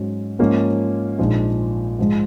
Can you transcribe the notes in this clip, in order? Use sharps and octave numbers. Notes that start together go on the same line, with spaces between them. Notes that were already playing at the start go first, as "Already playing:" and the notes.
Already playing: G#2 F#3 C#4
G#2 F3 A#3 C#4
A#1 A#2 F3 G#3 D#4
G#2 F3 G#3